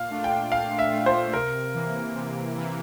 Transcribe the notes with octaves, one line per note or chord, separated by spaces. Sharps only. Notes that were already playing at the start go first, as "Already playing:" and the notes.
Already playing: A#2 F5
A3 D4 F4
G5
A#2 F5
E5
A3 D4 F4
C5
C3 A#4
E3 A#3
C3
E3 A#3